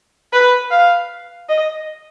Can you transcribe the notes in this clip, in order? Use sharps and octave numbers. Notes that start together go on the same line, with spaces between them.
B4
F5
D#5